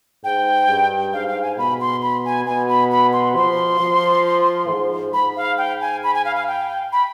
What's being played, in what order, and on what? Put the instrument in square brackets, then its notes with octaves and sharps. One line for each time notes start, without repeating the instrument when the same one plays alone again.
[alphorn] G#2 [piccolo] G5
[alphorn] G2
[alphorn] G#2 [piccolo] F5
[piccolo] F5
G#5
[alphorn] B2 [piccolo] B5
[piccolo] C6
B5
G#5
[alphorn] B2 [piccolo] G#5
[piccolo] B5
B5
C6
[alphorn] F3 [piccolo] C6
[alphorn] F3
G#2
[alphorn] G#2 [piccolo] B5
[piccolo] F5
G5
G#5
B5
G#5
F5
F5
G5
B5